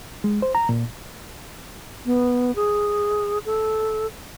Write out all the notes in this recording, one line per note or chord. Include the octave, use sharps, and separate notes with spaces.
G#3
C5
A#5
A#2
B3
G#4
A4